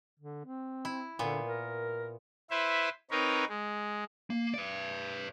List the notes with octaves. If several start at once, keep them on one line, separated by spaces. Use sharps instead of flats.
D3
C4
E4
A#2 D3 B3
A#4
E4 B4 C5 E5
C4 D#4 A#4 B4 C#5
G#3
A#3
B4 D5